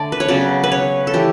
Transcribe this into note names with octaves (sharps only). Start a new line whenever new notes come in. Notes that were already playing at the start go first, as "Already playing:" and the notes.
Already playing: D3 A3 D5
B4
C#5
C#3 F#3 B3 D5
B4
C#5
A4
E3 A3 G4